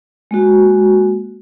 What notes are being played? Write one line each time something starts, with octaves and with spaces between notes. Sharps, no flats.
G#3 A#3 F#4